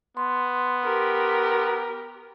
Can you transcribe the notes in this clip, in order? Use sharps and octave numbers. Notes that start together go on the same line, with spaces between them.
B3 C6
G4 A#4